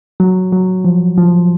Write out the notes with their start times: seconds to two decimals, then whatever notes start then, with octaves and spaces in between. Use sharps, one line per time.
0.20 F#3
0.52 F#3
0.85 F3
1.18 F3